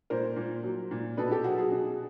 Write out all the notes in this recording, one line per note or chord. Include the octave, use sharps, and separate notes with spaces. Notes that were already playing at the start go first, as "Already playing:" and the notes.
A#2 A#4 C5
A#2
F#3
A#2
B2 A4 B4
G4 A4
F#3 F#4 G#4
A4
F#4 G#4
B2